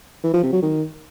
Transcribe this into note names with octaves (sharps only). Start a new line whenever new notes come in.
E3
F3
C3
F#3
D#3